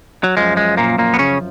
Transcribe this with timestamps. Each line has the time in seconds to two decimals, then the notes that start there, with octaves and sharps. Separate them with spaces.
0.24 F#3
0.37 F#2 F3 G#3
0.57 G#3
0.77 A#2 A#3
0.98 A#2 A#3
1.14 B3
1.19 C#3 C#4